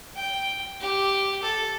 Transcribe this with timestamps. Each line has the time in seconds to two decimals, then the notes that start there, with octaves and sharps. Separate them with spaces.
0.16 G5
0.80 G4
1.42 A4